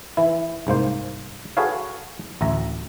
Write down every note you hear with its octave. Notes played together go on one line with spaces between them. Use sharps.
E3 E4
C2 G#2 A#3 C5
F#4 G#4 A4 B4 C#5 F5
A1 D2 E5 A#5